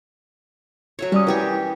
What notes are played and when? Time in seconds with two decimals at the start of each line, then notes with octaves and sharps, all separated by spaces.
0.99 F#3 A3 C#5
1.12 G3 C#4 D5 D#6
1.27 E3 G4 A#4 C#5